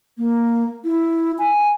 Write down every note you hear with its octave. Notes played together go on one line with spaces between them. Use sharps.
A#3
E4
G#5